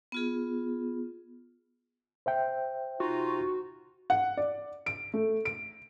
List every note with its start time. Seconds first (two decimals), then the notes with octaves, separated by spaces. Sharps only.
0.12 B3 F4 G#4
2.26 C5 E5 G5
3.00 C3 D#4 F4 F#4
4.10 F#5
4.37 D5
4.86 D7
5.14 A3
5.45 D7